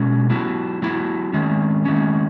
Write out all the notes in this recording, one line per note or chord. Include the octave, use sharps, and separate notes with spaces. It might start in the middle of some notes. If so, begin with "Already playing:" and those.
Already playing: B2 G#3 C#4
F#3 B3 E4
F#3 B3 E4
D#3 G#3 C#4
D#3 G#3 C#4